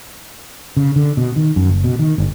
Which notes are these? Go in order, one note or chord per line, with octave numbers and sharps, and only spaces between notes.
C#3
D3
B2
D#3
F#2
F#1
B2
D#3
G1